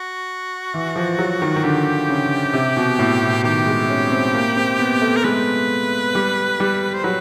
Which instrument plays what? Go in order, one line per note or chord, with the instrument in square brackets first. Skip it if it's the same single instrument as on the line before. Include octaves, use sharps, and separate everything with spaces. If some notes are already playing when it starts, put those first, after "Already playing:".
Already playing: [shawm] F#4
[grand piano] E3
F3
F#3
D#3
D#3
[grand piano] D3 [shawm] G4
[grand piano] C#3
C3
B2
A2
B2
[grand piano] D#3 [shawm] G4
[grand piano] G#3
C#4
C4
A#3
C4
B3
A3
[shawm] A#4
[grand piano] G#3 [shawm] B4
[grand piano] G3
G3
[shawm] C5
[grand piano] F#3 [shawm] B4